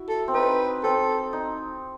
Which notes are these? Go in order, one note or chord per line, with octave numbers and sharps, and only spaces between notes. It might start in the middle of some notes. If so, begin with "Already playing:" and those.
Already playing: E4 F#4
A4
C4
D#4 B4
C4 A4
D#4